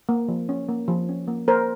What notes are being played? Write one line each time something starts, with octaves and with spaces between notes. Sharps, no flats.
A#3
F3
C#4
A#3
F3
C#4
A#3
A#3 A#4 C5